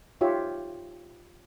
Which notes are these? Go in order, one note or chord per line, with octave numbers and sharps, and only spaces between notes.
D#4 F4 G4 C#5 E5